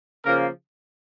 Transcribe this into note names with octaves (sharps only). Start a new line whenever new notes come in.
C#3 F3 A#3 A#4